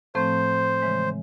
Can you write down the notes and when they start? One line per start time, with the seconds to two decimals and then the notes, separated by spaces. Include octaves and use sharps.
0.15 A2 F3 A3 C4 C5
0.82 C#3 E3 G#3